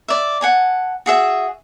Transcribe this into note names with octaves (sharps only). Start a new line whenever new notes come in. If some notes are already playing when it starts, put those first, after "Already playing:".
D5 E5
F#5 G#5 A5
F#4 G#4 E5